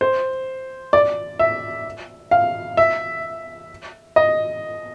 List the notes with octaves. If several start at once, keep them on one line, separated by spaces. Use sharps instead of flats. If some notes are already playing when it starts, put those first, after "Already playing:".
C5
D5
E5
F5
E5
D#5